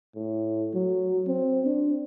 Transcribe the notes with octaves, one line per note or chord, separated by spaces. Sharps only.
A2
F#3
C4
D4